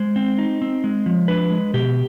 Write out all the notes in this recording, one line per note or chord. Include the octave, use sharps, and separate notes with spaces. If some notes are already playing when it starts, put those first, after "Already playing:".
Already playing: G#3 C5
C4
D#4
C4
G#3
F3
D4 B4
G#3
B2 G4